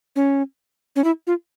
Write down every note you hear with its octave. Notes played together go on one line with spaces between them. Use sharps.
C#4
C#4
E4
F4